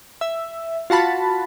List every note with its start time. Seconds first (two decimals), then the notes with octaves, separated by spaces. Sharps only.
0.21 E5
0.90 F4 F#4 A5 B5